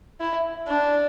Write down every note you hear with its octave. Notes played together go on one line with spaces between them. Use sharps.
E4
D4